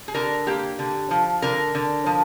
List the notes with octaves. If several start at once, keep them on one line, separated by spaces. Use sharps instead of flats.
G#4
D3 A#4
A#3 G4
D3
F3
D3 A#4
D3
F3